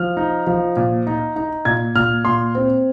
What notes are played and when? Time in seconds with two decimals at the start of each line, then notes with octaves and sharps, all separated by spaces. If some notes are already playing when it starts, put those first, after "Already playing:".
Already playing: F3 F6
0.17 D#4
0.47 F3
0.77 A#2
1.07 D#4
1.36 D#4
1.65 A#2 G#6
1.95 A#2 F6
2.25 A#2 C6
2.55 C4